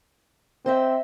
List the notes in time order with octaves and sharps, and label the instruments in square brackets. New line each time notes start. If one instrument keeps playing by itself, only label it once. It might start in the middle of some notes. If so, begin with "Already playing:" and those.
[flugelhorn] C4 [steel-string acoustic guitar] C5 D#5 E5